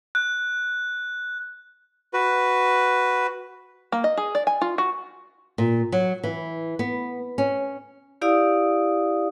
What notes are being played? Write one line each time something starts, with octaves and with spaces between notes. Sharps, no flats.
F#6
F#4 B4
A#3
D#5
G#4
D5
G#5
F4
F#4
A#2
F#3
E3
B3
C#4
E4 G4 D5 F5 D#6